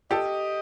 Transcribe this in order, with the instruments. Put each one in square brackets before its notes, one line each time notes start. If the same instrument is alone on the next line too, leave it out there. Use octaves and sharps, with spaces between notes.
[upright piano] G4 A4 [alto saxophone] D#5